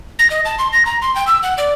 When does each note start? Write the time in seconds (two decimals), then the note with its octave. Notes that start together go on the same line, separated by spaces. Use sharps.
0.19 A#6
0.31 D#5
0.45 A5
0.59 C6
0.73 A#6
0.86 A#5
1.02 C6
1.16 G5
1.27 E6
1.43 F#5
1.58 D5